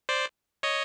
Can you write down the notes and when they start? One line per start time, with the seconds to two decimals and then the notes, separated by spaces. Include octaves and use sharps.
0.09 C5 D5
0.63 C#5 D#5